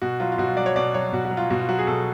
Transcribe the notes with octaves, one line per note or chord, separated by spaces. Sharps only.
B2 F#4
F#3 F4
F4
B2 F#4
F4
F#3 D5
C#5
B2 D5
F#3 C#5
B2 F#4
F#4
F#3
F4
B2 F#4
F4
F#3 F#4
G#4
B2 A4